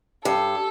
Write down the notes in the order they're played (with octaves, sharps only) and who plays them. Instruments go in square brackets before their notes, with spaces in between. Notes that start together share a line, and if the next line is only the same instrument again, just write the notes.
[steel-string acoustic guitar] G2 [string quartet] A4